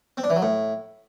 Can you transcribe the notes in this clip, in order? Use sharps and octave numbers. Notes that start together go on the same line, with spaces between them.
C4
D4
E3
F#3
A2